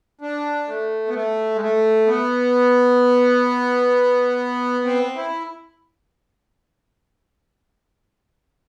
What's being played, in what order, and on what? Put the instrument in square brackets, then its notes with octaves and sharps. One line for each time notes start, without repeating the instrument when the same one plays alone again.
[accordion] D4
A3
B3
A3
G#3
A3
B3
C4
E4